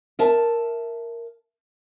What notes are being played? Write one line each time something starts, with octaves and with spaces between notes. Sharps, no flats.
A#4 E5 A5